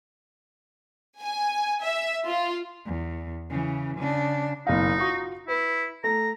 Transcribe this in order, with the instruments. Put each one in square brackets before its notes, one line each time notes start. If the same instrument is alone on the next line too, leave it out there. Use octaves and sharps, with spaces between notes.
[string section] G#5
E5
F4
[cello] E2
C#3 E3
C#3 D4
[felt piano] F#1 B2 F5 [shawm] D#4
[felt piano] F4 F#4 C#6
[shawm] E4 [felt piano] B4
[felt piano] A3 [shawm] A#5